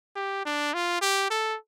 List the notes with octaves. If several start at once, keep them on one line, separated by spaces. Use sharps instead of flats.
G4
D4
F4
G4
A4